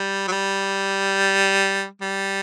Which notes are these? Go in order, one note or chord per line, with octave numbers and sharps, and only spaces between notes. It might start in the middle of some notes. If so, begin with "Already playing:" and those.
Already playing: G3
F#3
G3
G3